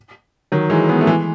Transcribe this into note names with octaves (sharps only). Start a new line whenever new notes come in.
D#3 F#3
E3 G#3
G#3 B3
A3
E3 G#3